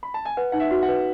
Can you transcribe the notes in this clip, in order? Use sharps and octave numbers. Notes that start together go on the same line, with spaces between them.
B5
A5
G#5
B4 F#5
D#4 F#5
E5
F#4
F#5
B4